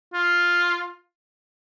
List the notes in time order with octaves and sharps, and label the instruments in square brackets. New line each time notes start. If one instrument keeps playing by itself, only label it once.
[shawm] F4